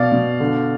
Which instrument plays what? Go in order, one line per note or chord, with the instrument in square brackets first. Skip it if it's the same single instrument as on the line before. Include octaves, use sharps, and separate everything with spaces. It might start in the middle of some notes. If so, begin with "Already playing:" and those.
Already playing: [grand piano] B2 D5 F5
B2
D3